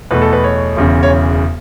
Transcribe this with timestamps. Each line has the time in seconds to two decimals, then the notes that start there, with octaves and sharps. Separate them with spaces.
0.11 E2 B2 A3 B4
0.22 A4
0.33 B4
0.44 C#5
0.76 E1 E2 C#3
1.03 C#5